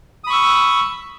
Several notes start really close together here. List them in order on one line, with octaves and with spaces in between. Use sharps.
D#6 B5 C#6 E6